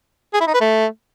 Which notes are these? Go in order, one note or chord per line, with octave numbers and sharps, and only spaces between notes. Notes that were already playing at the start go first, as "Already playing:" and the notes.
G#4
E4
D#4
B4
A3